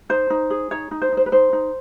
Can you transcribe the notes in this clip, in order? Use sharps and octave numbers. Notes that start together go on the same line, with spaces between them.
D#4 C5
D#4
G#4
D#4 C#5
D#4
C5
D#4 C5
B4
D#4 C5
D#4